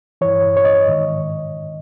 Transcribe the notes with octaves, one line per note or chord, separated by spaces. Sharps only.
G2 E3 C#5
C#5
D#5
G#2 D#3